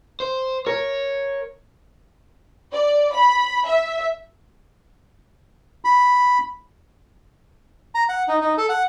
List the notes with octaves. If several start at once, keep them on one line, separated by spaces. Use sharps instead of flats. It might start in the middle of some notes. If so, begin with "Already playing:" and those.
C5
A#4 C#5
D5
B5
E5
B5
A#5
F#5
D#4
D#4
A4
F#5